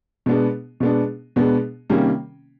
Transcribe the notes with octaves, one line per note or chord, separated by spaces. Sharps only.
B2 G#3 B3 D4
B2 G#3 B3 D4
B2 G#3 B3 D4
C3 D#3 G3 A#3 C#4